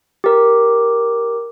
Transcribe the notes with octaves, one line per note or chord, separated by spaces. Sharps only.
G4 A#4